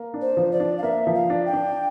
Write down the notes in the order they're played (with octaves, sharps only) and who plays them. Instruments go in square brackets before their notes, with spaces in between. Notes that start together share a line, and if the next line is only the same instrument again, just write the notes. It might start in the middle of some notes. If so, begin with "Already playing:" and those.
Already playing: [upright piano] A#3
D4
[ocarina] C5
[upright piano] F3
[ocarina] D5
[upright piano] D4
[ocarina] F5
[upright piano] A#3 [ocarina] E5
[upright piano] F3
[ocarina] F5
[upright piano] D4
[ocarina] G5
[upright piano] D4